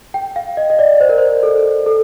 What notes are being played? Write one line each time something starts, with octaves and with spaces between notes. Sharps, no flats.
G5
F5
D#5
D#5
D5
C5
A#4
C5
A4
A4